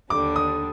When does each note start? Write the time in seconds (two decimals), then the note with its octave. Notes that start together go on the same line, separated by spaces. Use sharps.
0.10 D#2 D3 G3 D4 D6
0.36 D#6